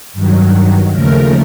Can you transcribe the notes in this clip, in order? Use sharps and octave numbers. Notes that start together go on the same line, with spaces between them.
G2 D#3 F#3
D#2 C#3 F3 A3 A#4